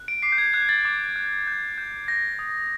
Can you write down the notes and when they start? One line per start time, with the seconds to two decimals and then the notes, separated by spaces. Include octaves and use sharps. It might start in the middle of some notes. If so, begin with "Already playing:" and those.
Already playing: F#6
0.08 D7
0.22 D6 C7
0.32 G6
0.38 G#6
0.54 F#6 G#6
0.69 A6
0.85 D6
1.16 F#6
1.47 G6
1.78 G6
2.08 G6 A#6
2.39 D#6